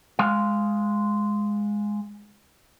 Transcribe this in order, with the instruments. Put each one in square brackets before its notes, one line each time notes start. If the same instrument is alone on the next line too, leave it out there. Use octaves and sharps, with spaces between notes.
[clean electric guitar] G#3 F5